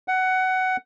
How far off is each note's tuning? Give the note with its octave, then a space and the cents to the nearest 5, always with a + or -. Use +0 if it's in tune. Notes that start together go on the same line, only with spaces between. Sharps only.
F#5 +15